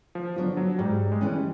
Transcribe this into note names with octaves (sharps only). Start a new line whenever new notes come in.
F3
D3 F3 F#3 B3
F#3
G#2 G3
G#3
E3 G3 A3 C#4